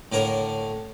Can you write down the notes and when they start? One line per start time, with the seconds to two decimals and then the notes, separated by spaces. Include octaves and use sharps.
0.12 A2 D3 A#4 C#5 C#6